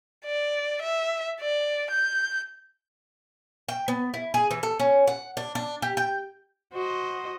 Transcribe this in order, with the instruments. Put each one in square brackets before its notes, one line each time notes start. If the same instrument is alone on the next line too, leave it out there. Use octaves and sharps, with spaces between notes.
[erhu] D5
E5
D5
G6
[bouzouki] G5
B3
E4
G#4
E3
A4
C#4
F#5
D4
D4
G4
G5
[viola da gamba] F#4 C5 D#5